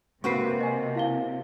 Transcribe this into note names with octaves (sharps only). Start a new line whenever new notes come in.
C3 A#3 C4 F#4 B4 C#6 C7
D#5 G#5
E4 F5 G7